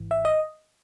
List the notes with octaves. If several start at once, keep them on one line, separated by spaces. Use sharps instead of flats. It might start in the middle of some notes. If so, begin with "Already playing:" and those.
Already playing: G#1 G#2 E3
E5
D#5